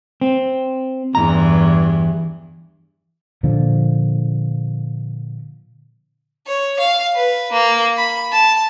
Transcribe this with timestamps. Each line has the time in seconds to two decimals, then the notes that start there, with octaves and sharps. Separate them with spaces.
0.21 C4
1.15 E2 G2 E3 A#5
3.43 A#2 D3 F3
6.47 C#5
6.79 F5
7.15 B4
7.52 A#3
7.97 B5
8.32 A5